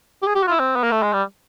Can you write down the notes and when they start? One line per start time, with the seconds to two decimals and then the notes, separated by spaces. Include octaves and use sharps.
0.23 G4
0.27 G#4
0.35 G4
0.42 F#4
0.47 F4
0.51 E4
0.59 C4
0.76 B3
0.83 A#3
0.91 A3
1.02 G#3
1.13 G3